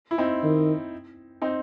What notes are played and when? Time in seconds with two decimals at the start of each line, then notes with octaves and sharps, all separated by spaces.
0.11 E4
0.18 C4 D#4
0.43 D#3
1.42 C4 D#4